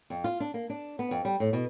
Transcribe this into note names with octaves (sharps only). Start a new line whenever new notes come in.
F2
F4
D4
A#3
D4
B3
F2
G3
A2
B2